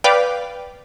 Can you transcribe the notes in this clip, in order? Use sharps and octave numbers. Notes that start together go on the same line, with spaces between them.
B4 D5 F5 G5 D6